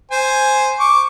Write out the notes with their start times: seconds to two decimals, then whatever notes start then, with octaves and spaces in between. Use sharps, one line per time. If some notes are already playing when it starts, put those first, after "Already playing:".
0.11 C5 G#5
0.80 C#6 D6